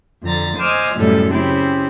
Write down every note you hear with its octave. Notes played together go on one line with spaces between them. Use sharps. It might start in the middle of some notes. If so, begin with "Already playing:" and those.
F2 D3 A#5 A6
C5 D#5 G#5 D6 E6 F6
F#2 A2 C3 G3 A4
C#3 C4 E4 G4